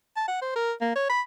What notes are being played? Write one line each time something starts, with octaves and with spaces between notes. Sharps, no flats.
A5
F#5
C5
A#4
A#3
C#5
B5